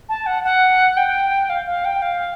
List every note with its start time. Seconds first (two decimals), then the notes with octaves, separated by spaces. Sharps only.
0.09 A5
0.26 F#5
0.44 F#5
0.97 G5
1.50 F5
1.67 F5
1.85 G5
2.02 F5